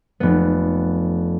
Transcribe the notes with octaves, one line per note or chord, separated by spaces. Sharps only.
F1 B3